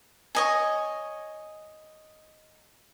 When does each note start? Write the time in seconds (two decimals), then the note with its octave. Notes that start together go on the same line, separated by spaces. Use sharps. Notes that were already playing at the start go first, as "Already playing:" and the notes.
0.35 C#5 D#5 G#5